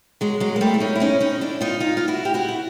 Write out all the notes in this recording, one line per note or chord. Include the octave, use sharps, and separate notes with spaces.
F#3 G#3
F#3 G#3
A#3
G3 A3
E4
C#4 D#4
E4
C#4 D#4
C#4 D#4
D4 E4
D#4 F4
D#4 F4
F4
E4 F#4
G4
E4 F#4
F#4